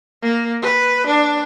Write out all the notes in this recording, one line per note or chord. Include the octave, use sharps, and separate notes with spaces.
A#3
B4
D4